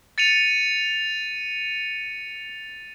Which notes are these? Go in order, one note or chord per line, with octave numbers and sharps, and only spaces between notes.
A6 C#7 D#7 F7